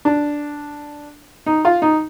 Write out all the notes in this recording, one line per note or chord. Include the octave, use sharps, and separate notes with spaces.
D4
D#4
F4
D#4